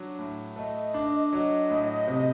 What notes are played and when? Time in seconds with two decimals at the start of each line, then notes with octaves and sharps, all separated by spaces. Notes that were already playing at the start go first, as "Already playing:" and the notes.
Already playing: F#3 D4
0.19 A2
0.56 A3 D#5
0.94 D4
1.31 F#3 D#5
1.70 A2
2.07 C3